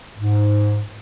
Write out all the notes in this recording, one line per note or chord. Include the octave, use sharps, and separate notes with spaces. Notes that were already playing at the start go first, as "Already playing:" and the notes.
G#2